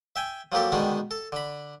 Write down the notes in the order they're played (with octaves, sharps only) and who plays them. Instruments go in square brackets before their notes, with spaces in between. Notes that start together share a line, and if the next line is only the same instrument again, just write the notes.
[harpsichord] E5 G5 G#5
F3 F#3 A#3 G4 A4
B2 D3 D#3 G3 G#3 B3
A4
D3 B5